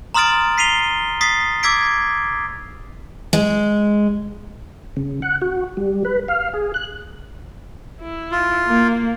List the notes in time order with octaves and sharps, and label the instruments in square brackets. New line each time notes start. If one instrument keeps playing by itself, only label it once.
[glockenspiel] A#5 C6 D#6 F6 A6 D7
B6 C7 D#7 F7 G7
D#6 A6 B6 C7
D6 E6 G#6 B6 D7
[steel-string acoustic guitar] G#3
[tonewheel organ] C#3
F#5
F#4
G3
B4
F5
G#4
F#6
[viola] E4
[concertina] F4
[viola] A#3